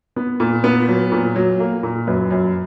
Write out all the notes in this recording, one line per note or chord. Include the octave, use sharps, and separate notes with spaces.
B3
A#2
B3
F#3
A#2
F#3
A#3
A#2
F#2 B4
F#2